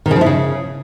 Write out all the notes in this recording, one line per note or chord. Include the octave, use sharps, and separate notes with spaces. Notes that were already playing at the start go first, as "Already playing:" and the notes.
D#3
C#3
F3
E4
C#3